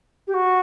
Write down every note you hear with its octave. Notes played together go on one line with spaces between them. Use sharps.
G4
F#4